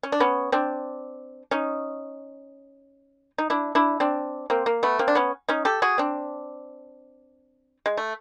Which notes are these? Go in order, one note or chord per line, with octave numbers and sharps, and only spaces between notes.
C#4
D4
B3 C#4
C4 D4
C#4 D#4
D#4
D4 E4
D4 E4
C4 D4
A#3 C4
A#3
A3 B3
A#3 C4
D4
B3 C#4
C#4 D#4
G4 A4
F#4 G#4
C4 D4
G#3
A3